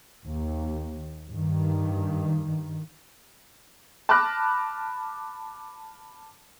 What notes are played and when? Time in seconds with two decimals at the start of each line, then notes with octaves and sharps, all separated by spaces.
0.25 D#2
1.30 G2 D#3
4.09 A5 B5 D6 F6 F#6 A#6